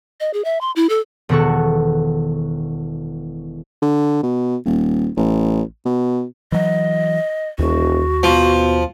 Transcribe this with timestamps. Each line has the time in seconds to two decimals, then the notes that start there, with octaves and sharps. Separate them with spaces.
0.20 D#5
0.33 G#4
0.45 E5
0.61 C6
0.76 E4
0.89 A4
1.29 E1 D#3 B3 F#4 A4 C#6
3.82 D3
4.23 B2
4.66 D#1
5.17 A1
5.86 B2
6.52 E3 F#3 D#5
7.59 E1 D#2 F#4
8.23 B2 F3